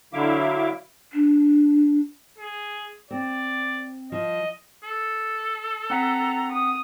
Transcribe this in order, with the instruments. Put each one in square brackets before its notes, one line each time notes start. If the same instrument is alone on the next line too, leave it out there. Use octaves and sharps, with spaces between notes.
[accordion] D3 F#3 E4 E5 F5 D6
[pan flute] D4
[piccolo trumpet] G#4
[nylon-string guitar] C4 [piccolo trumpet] D5
[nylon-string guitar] F3 [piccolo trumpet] D#5
[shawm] A4
[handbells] C4 F#5 B6 [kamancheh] A#5
[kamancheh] D#6